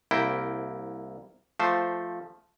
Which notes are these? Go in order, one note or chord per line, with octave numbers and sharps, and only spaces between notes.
C2 A#3 E4 G5
F3 A3 C5